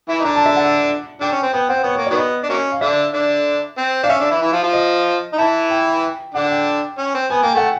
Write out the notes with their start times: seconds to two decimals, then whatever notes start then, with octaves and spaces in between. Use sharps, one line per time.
0.08 E3 E4
0.20 D#4
0.25 D3 D4 A#5
0.36 A5
0.46 E5
0.56 F#5
1.21 D3 D4 G5
1.32 C#4
1.42 C4
1.53 B3 G5
1.69 C4 F#5
1.83 B3 C#5
1.96 A#3 C#5
2.07 D5
2.11 D#3 F#3 B3
2.18 D#5
2.43 D4
2.49 F#3 A#3 C#4
2.72 F5
2.81 D3 D4 E5
3.14 D3 D4
3.78 C4
4.03 D4 F5
4.09 C#4 E5
4.20 D3 D4
4.31 E3 E4
4.42 E3 E4
4.53 F3 F4
4.63 F3 F4
4.73 D#5
5.33 D#4
5.38 E3 E4 A5
5.70 G5
6.34 D3 D4 F#5
6.50 G5
6.98 C#4
7.14 C4
7.30 B3 G#5
7.42 A#3 G5
7.54 A3 F#5